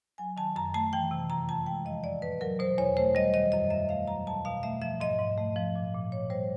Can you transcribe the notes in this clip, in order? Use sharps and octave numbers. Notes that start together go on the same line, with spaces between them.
F#3 G#5
D#3 A5
F#2 A#5
A3 A5
E3 G5
C3
F2 A#5
F2 A5
G#3 G5
F3 D#5
A2 D5
A2 B4
F#3 A#4
B2 C5
E2 C#5
A3 C5
G3 D#5
D#3 D#5
F#2 D#5
F#2 E5
A3 F5
F#3 A#5
B2 A5
B2 F5
A3 E5
F3 E5
G#2 D#5
G#2
A3
F3
A#2
A#2
A#2 C#5
G3 C5